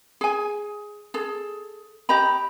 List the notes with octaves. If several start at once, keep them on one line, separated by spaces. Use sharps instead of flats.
G#4 G#5
G#4 A4
G4 D#5 A#5 B5